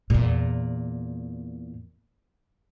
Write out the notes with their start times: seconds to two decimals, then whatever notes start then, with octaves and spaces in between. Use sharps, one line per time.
0.10 E2 A#2